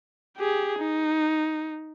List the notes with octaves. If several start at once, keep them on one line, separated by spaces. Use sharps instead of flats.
G4 G#4
D#4